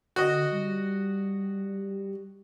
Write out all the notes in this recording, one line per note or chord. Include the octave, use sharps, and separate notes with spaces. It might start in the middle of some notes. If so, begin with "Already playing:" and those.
D3 F#4 D#5
G3